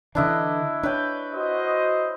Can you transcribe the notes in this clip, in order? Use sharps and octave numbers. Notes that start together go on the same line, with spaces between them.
D3 E3 D4 E4 D#5
D4 B4 C#5 G5
F#4 C5 D#5